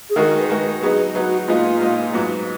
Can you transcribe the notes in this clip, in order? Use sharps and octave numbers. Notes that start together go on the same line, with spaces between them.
G#4
D#3 G#3 D#4 F#4 A#4
A#4
B4
D#3 G#3 D#4 F#4 B4
F#3 B3 D#4 G#4
F#3 B3 D#4 F#4
A#2 G#3 B3 D#4 F4
A#2 G#3 B3 D#4
G#2 F#3 B3